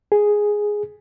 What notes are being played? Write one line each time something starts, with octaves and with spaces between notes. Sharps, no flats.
G#4